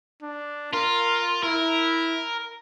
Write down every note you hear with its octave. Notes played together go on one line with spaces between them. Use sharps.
D4
F4 A#4
E4 A#4